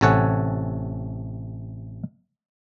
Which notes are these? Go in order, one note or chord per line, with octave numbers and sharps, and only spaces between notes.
A1 C3 A4 C#5 F#5 G#5